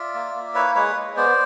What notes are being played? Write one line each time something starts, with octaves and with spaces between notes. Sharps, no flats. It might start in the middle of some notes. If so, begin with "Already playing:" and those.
Already playing: F4 D5 E5
A#3
A#3
E4 B4 C#5
G#3 B4 C#5
G#3
B3 C5 D5